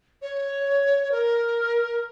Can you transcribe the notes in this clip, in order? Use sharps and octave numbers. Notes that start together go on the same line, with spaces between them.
C#5
A#4